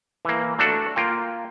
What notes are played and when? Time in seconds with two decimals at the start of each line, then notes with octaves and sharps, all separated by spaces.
0.25 E3 A#3
0.59 A3 D4 F#4 A4
0.96 A#3 F4 G5